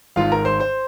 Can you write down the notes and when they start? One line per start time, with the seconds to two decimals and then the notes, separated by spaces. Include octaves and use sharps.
0.16 G#1 G#2 D#3 F4 F5
0.32 A#4 A#5
0.45 C5 C6
0.60 C5 C6